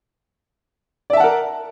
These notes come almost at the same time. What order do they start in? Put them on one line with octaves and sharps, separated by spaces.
D5 E5 A5 F#5 A#4